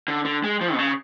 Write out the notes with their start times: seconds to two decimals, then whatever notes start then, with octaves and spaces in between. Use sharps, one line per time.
0.08 D3
0.25 D3
0.44 G#3
0.61 F3
0.74 B2
0.79 C#3